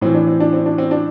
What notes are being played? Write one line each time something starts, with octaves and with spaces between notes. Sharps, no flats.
A2 E3 C4
D4
C4
D4
C4
D4
C4
D4